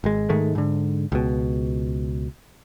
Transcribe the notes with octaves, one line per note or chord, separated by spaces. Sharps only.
G#1 G#3
G#2 D#3 G#3 A3
G#2 D3
C#2 B2